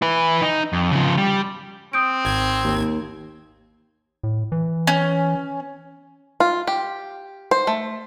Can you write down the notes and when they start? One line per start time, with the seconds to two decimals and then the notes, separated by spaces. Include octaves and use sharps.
0.02 E4 B4
0.42 D#4
0.73 F2
0.92 C#3 F3
1.17 G3
1.93 C4 D#6 G6 D7
2.25 G#1 G#6
2.64 D#2
4.23 A2
4.52 E3
4.87 C#4
6.40 F4
6.67 G4
7.51 C5
7.67 A3